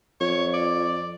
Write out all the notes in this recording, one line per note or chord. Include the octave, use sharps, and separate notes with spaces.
F2 C#5
D5